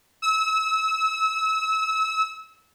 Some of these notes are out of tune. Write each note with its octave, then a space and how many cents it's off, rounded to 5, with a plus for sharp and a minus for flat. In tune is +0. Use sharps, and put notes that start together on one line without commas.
E6 -30